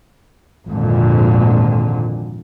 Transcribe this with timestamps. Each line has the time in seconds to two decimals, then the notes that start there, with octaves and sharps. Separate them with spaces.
0.69 G#1 F2 A#2 D3